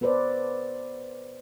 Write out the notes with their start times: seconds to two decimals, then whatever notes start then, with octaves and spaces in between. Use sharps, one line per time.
0.01 B3 A4 B4 C5 D5